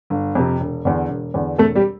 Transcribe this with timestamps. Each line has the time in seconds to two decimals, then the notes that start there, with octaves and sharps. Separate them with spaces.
0.10 G1
0.35 F2 C3
0.60 E1
0.85 E2 D3
1.09 E1
1.34 E2 D3
1.58 E1 A3 A4
1.75 G3 G4